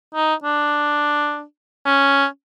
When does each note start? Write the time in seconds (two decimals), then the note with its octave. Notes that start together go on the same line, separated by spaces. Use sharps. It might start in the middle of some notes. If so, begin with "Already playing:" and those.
0.15 D#4
0.44 D4
1.86 C#4